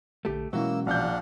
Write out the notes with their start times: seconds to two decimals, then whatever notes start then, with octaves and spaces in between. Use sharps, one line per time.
0.25 A#1 D3 A3 G4
0.53 B2 E3 F#3 G#3 A#3 C#4 E4 E6
0.87 A#1 D4 F5 F#5 G6